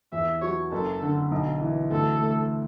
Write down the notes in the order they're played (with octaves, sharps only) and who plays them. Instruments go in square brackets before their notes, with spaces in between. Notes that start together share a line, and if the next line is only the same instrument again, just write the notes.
[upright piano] E2 [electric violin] E5
[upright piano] F#3 [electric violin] C#5
[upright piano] F#1 [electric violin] A4
[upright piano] D3
B1
E3
[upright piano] D2 [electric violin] A4
[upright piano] A3